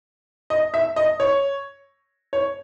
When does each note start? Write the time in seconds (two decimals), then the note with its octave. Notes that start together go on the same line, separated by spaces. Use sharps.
0.50 D#5
0.74 E5
0.96 D#5
1.20 C#5
2.33 C#5